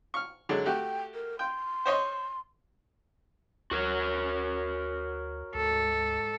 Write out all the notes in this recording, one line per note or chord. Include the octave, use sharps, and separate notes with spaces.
C#6 F6
D3 F#3 G#3
A3 F#4 G4 G5
A#4
G5 C6
C5 C#5 D#5
D2 F#4 A#4 C#5
D2 G#2 A4